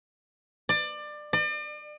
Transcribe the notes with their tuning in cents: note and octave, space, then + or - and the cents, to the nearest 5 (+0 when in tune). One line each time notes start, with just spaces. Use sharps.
D5 +25
D5 +40